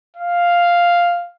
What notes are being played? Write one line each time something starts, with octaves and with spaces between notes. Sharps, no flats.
F5